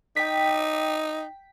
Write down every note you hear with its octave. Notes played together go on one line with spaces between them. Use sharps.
D#4 G5 B6